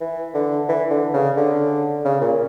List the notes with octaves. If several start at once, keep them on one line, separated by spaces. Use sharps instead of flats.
E3
D3
E3
D3
C#3
D3
C#3
A#2